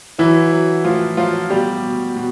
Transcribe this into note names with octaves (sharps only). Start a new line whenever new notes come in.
E3 F#3 E4
F#3
A2 F3 F4
F3 F#3 F4
B2 G3 G4
B2
B2